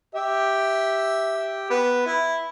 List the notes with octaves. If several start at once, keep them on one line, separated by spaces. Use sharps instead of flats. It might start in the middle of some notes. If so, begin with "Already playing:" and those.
G4 E5
B3
E4